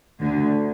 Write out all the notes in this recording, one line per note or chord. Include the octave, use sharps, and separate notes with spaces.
D2 D3